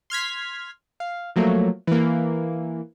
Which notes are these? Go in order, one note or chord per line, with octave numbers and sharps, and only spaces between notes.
C6 F6 G#6 B6
F5
F3 F#3 A3 A#3
E3 A#3